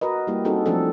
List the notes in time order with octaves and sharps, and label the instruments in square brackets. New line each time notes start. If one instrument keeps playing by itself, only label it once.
[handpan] F#4 A#4 B4 D#5
G3 A#3 E4 G4
C4 C#4 D#4 F#4 G#4 A4
F3 F#3 A3 C4 D4 A4